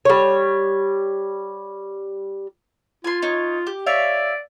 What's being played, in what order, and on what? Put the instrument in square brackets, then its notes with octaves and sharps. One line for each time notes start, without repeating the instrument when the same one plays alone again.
[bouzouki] G3 C#5
[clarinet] F4 [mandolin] G#5 C6
[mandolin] D#4 C#5
G4
[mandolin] C#5 E5 F5 [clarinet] D5